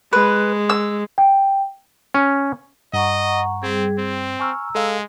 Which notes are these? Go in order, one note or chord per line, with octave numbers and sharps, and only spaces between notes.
G#3 B4
E6
G5
C#4
G2 D#5 F#5 A#5 C#6
G3 C4 G#4
C4
G#5 A#5 C#6 E6 F6
G#3 A4 F5